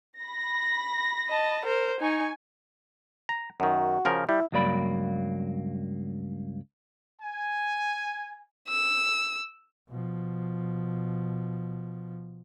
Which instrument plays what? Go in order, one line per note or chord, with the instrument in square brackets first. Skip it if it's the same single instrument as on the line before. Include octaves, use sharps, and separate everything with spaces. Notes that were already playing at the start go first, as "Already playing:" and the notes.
[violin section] B5 A#6
[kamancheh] D#5 A5
A#4 C5
[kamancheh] D#4 C#6 [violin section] G#5
[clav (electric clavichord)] A#5
[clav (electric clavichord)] F#2 D#3 [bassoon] F#4
[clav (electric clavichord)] C#3 F3 A#4
[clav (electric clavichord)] G3 [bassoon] E4
[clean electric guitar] C#2 G2 F#3 A#3 D5 B5
[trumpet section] G#5
[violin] E6
[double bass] B2 F3